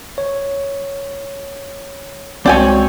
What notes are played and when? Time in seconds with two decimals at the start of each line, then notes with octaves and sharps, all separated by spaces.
0.18 C#5
2.46 C2 G#3 C4 F#4 C#5 D5 G5 G#5